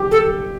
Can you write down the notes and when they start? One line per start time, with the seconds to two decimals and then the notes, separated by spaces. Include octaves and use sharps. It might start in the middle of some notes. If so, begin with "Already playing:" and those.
Already playing: G4
0.11 A4